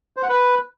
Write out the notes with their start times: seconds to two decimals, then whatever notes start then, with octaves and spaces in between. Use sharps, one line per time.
0.17 C5
0.23 F#5
0.29 B4